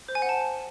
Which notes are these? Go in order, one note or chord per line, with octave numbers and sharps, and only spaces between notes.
C5
G#5
F#5
A5